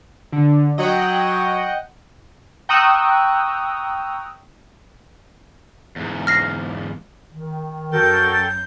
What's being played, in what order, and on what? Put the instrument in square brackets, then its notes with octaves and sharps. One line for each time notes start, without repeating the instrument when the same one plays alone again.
[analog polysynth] D3
[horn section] F#3 [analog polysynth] D#5 F#5 G5
[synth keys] G5 A#5 C#6 D#6 E6 F#6
[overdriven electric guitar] E2 G#2
[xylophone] F6 A#6 C7
[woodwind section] D#3
[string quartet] F#2 G6 [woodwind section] F#4 A#4 [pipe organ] A4 G5 A6